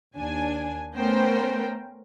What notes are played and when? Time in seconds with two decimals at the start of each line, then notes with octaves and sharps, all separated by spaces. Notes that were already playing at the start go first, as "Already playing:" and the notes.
0.15 D#2 D4 G#5
0.95 A3 B3 C#4 A#4 C5 G5